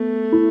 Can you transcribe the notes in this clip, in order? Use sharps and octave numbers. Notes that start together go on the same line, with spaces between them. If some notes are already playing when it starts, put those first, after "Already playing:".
Already playing: A3 B3
E4